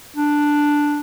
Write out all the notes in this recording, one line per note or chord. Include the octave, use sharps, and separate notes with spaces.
D4